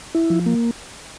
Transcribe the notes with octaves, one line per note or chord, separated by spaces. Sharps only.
E4
F3
A#3